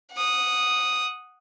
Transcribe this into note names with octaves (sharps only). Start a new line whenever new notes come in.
F#5 D#6